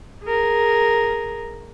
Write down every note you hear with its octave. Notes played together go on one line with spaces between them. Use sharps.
G#4 A#4